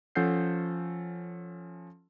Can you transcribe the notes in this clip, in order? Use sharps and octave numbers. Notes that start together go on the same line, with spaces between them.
F3 C#4 A4 F#5 G6 C7